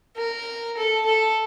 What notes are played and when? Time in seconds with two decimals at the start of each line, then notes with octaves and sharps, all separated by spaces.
0.17 A#4
0.77 A4
1.05 A4